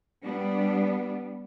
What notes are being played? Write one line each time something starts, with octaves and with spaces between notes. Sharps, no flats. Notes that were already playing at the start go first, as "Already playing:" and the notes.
G3 B3 D4